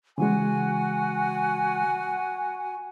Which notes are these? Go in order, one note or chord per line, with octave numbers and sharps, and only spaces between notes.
C#3 E3 G#3 F#4 F#5 G#5